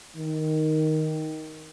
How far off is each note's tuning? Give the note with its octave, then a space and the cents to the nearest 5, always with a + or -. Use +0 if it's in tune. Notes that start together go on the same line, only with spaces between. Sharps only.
D#3 +5